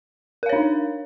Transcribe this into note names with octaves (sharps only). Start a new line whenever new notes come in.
D4 D#4 A#4 C#5 F5